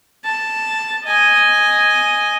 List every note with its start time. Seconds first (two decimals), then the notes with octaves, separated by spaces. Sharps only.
0.25 A5
1.05 D#5 G#5